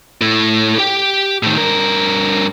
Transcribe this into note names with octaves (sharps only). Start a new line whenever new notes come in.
A2 A3
G4 G5
A2 D#3
G2 A#4